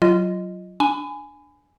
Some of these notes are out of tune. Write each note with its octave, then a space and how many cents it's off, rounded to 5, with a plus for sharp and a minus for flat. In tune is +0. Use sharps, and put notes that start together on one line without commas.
F#3 +0 F4 -20 D#5 +0
D4 +0 G#5 +0 B5 +35